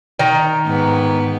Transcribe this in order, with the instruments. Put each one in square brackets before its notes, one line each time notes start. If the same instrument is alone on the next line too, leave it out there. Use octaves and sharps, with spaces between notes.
[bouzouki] D#3 A#5
[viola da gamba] G#2 B3